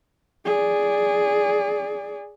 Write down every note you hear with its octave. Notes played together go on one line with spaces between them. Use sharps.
G#4 D5